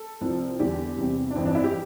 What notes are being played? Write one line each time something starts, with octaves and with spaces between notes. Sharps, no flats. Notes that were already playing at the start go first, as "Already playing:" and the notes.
Already playing: A4
C2 C3 F3
E2 D3 G3 G4
E2 C3 G3
D4
G1 F2 E3 C4
D4
E4
G4